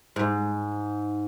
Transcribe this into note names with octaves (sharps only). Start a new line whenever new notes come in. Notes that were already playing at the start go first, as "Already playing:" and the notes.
G#2